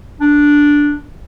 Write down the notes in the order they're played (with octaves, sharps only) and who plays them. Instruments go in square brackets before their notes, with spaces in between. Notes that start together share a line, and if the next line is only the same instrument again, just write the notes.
[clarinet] D4